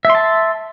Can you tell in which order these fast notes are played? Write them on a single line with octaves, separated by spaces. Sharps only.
E5 C6 A5